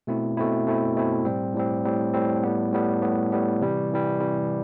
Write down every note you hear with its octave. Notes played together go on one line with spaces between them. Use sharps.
B2 A3 C4 E4
B2 A3 C4 E4
B2 A3 C4 E4
B2 A3 C4 E4
A2 G3 C4
A2 G3 C4
A2 G3 C4
A2 G3 C4
A2 G3 B3
A2 G3 B3
A2 G3 B3
A2 G3 B3
C3 E3 G3
C3 E3 G3
C3 E3 G3